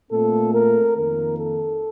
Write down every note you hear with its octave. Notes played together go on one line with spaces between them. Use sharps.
A#2 A3 C4 A4
A#4
F2 D#3 A#3 A#4
A4